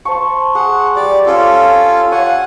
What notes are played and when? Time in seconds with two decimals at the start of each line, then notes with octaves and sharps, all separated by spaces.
0.05 C5 A5 C#6
0.55 G#4 F#5
0.96 G3 D5
1.26 C#4 F4 A4
2.12 C#5 F5 F#5 G#5